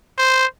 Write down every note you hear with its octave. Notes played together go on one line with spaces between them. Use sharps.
C5